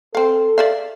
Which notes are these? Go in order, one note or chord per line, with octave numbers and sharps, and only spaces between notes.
C4 A4 F5
D5 E5 F5